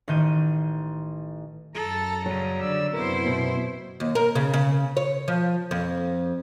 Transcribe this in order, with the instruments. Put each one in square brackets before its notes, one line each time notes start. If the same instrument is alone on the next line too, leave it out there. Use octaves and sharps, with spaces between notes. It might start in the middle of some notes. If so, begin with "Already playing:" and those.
[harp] A1 D#3 G6 D#7
[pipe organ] F#2 A#5 [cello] A4
[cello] C#3 G3 [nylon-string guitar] F#3
[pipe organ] D3 D5 E6
[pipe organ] F#2 C3 B3 [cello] E4 C5 [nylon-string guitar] A#4
[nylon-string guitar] B2 E5
[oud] D#2
A#4
C#3
C#3
C#5
F3
F2